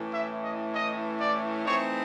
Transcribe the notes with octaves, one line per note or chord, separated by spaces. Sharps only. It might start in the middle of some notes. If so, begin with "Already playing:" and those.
Already playing: A2 E3 A3 C#4
E5
D#5
D#5
D5
E3 A3 C4 D#4 C#5